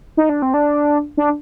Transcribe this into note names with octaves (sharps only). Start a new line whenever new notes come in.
D#4
D4
C4
D4
D4